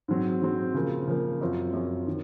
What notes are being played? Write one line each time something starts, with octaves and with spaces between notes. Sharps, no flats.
G#2 F#3 C4
G#2 F#3 C4
C#3 F3 A#3
C#3 F3 A#3
F#2 F3 C4 F4
F#2 F3 C4 F4
D#3